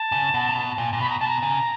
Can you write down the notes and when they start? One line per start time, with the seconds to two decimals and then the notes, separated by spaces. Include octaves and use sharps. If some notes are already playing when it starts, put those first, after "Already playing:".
Already playing: A5
0.12 C#3
0.34 B2
0.48 C3
0.55 B2
0.78 A#2
0.93 A#2
0.99 B2 B5
1.09 A#5
1.20 B2 A5
1.28 A#5
1.43 C#3